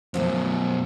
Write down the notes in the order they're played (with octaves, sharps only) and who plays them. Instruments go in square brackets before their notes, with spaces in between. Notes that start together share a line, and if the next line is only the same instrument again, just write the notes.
[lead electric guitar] F#2 B2 [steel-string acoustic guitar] F3 A3 A#3